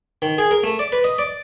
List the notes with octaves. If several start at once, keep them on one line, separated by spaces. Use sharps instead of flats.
D#3
G#4
A#4
A3
D5
B4
D#5
D5